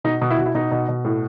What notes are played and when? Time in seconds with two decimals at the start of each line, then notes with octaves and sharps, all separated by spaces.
0.04 B2 D#4
0.21 B2
0.31 E4
0.38 B2 F#4
0.46 E4
0.55 B2 D#4
0.71 B2
0.88 B2
1.05 A2